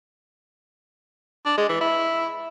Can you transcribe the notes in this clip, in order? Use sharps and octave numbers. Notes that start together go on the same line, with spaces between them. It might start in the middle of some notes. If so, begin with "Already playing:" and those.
D4
G#3
E3
E4